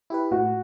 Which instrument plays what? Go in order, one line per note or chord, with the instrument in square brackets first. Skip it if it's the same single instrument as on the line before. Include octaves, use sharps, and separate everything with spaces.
[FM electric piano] E4 G4 B4
[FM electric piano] A2 [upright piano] F#4